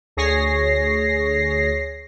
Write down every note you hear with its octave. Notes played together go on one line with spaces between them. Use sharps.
D2 G#4 C#5 A#6 C7